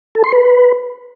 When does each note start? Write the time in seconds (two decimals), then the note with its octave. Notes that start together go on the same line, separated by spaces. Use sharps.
0.15 A4
0.24 C6
0.32 B4